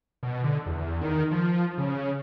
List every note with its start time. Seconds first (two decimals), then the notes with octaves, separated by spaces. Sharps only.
0.23 B2
0.44 D3
0.66 E2
1.01 D#3
1.31 F3
1.78 C#3